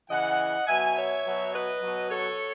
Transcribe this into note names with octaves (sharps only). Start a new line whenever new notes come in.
C#3 E3 D#5 F#5
B2 F#3 E5 G#5
C#5 E5
B2 F#3
B4 D#5
B2 F#3
A4 C#5